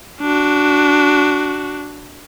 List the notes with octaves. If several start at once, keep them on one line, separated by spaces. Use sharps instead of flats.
D4 F#4